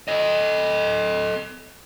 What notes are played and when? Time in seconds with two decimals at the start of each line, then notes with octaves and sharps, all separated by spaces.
0.08 A4 D#5